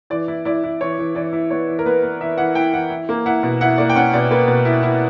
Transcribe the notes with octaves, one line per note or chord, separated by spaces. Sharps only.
E3 D5
E4
E4 D5
E4
E3 C#5
E3
E3 D5
E4
B3 C#5
E3
A#4
B3 B4
B3
E3 E5
E3 F#5
E4 G5
E3 F#5
E4
A#3
E4 F#5
B2
E4 F#5
A#3 D5
G5
C#4 F#5
B2 D5
A#3 B4
B2
E4
E4